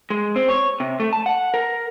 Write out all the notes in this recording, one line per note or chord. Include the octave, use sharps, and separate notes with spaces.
G#3
C4
C#5
C3
A3
A5
F#5
A#4